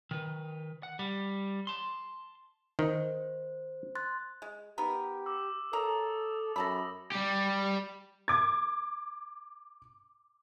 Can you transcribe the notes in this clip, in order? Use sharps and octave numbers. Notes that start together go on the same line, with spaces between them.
D#3 B4
F#5
G3
A5 C6
D#3 C5
C6 F#6 A6
G#3
B3 D#4 G4 A#4
D6 E6
A4 A#4 C#5 A#5 D#6
F#2 A4 A5 B5 E6 A#6
G3 G4
D6 G#6